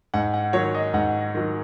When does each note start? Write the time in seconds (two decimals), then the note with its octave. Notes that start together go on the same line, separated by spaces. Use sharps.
0.14 G#2 F#5
0.34 F#5
0.53 D#3 F#3 C#5
0.74 D#5
0.94 G#2 F#5
1.35 D#3 F#3